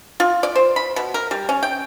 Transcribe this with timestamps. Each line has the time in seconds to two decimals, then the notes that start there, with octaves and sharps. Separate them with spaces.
0.20 F4
0.43 D5
0.55 C5
0.76 B5
0.96 B2
1.14 A#4
1.31 G3
1.49 C#4
1.63 G5